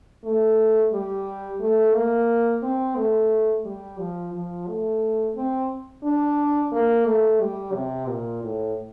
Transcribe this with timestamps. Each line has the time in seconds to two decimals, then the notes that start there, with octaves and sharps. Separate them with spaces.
0.24 A3
0.92 G3
1.60 A3
1.94 A#3
2.63 C4
2.96 A3
3.65 G3
3.99 F3
4.33 F3
4.67 A3
5.36 C4
6.03 D4
6.72 A#3
7.06 A3
7.40 G3
7.73 C3
8.08 A#2
8.42 A2